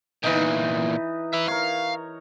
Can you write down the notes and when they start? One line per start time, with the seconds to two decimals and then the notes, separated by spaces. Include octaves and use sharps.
0.24 E2 A#2 E3 D#4
1.33 B4 E5
1.48 A#4 C#5 F5